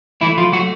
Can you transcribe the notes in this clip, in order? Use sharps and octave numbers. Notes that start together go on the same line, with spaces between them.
E3 A3 E4
F3 F4
F#3 A3 F#4